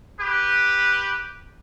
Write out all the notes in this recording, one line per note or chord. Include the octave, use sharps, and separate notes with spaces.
G4 B4